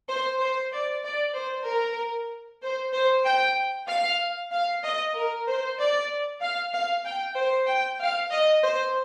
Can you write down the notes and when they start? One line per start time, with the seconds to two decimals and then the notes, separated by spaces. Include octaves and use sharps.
0.09 C5
0.40 C5
0.72 D5
1.04 D5
1.35 C5
1.67 A#4
2.62 C5
2.93 C5
3.24 G5
3.88 F5
4.52 F5
4.83 D#5
5.15 A#4
5.47 C5
5.79 D5
6.41 F5
6.72 F5
7.04 G5
7.37 C5
7.67 G5
8.00 F5
8.31 D#5
8.62 C5